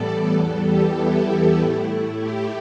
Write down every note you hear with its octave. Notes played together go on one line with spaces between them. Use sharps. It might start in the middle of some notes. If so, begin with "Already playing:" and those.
Already playing: A2 E3 G3 B3 A4 D5
E2 E3 G3 B3 A4
G4
E4
G4
A2 A3 E4
G4